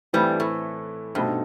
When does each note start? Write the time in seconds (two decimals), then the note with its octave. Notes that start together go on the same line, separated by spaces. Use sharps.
0.13 G2 E3 G3 A3 C4 E4 B4
0.40 A2
1.15 G2 B2 A3 D#4 A4 C5